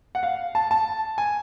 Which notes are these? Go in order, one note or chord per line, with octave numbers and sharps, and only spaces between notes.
F#5
F5
A5
A5
G#5